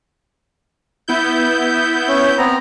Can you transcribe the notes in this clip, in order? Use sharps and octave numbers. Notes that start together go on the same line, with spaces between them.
B3 E4 G6
C#4
B3 C4 A#5